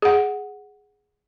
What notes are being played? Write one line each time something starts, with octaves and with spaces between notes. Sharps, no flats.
G#4 F#5